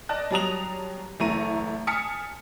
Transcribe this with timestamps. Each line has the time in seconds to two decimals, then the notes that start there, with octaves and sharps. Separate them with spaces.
0.09 D5 D#5 A5 F#6
0.31 F#3 G3 A5 A#5 D#6 F7
1.20 F#1 E3 A3 A#5 C#6 D#7
1.87 G#5 A5 D#6 F6 B6 C#7